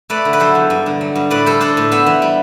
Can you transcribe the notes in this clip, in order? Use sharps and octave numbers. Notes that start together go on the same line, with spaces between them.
A3 B4 D5
D3
B4
F#3 A4 C5
E2
G2
D3
F#3
G2
A2 B4 D5
G3 A4 C5
D4 A4 C5
A2
B3 C5 E5
E3
G3